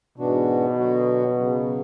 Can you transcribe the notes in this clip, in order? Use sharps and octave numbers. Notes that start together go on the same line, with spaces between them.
G#2 B2 E3 B3 D4 F#4
D3 F#3 B3 F#4
C#3 F#3 B3